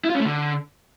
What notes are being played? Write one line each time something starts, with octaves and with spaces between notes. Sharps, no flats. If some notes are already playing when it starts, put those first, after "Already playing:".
E4
F4
C#4
A3
D3